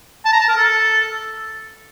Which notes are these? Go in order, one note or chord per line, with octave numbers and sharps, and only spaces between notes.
A5
A#5
A5
A#4
A4